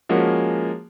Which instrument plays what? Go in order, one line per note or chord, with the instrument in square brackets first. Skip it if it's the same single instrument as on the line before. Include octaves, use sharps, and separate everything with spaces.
[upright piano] F3 G#3 A#3 C#4 F#4